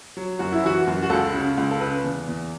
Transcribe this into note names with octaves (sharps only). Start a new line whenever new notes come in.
F#3
F#2 F#4
E4
E3 F#4
F#2
F#4
C#2 A4
C#3
C#2
A4
C#3 B4
E2
E2